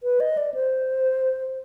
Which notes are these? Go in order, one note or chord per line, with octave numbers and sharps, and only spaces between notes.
B4
D#5
D5
C5